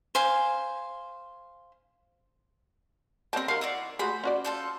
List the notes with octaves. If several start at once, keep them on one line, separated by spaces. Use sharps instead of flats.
C5 F5 G#5
C4 G4 A#4 C5 A5
D#3 A#4 F5 F#5 C6
E4 F#4 D5
A3 F#4 G#4 C5 B5
C#4 F#4 D5
F4 A4 G6